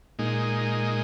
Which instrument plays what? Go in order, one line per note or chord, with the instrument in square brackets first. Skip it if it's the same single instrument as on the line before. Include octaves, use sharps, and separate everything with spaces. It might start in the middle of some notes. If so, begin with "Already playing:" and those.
[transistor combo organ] A#2 G#3 D#4